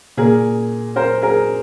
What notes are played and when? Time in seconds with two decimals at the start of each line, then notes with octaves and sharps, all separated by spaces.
0.17 A#2 G#4 A#4
0.96 A#4 C5
1.22 G#4 A#4